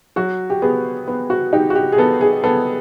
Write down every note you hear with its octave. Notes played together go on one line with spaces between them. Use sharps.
F#3 F#4
G4
B3 G#4
B3
F#4
D#4 G4
F#4
G4
G#4
B3 A4
G#4
B3 A4